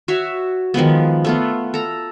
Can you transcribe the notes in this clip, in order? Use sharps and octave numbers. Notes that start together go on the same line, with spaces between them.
F#4 C#5 E5
D#3 F3 G#3 B3
A3 B3 F4
A4 A#5